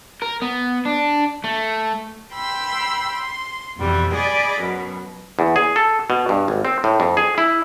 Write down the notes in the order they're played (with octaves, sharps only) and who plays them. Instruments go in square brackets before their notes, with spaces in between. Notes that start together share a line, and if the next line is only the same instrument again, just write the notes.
[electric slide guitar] A#4
B3
D4
A3
[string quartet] G5 B5 C6 E6
C6
F2 B2 E3 G3
G#4 D5 D#5 B5
F#2 B2 F#3
[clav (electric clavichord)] E2
G#4
A4
B2
G2
G#1
C4
A2
F2
G#4
E4